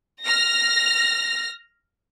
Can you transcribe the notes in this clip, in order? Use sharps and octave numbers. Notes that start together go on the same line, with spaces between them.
F6 A#6